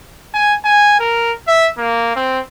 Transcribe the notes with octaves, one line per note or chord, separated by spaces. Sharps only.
G#5
G#5
A#4
E5
A#3
C4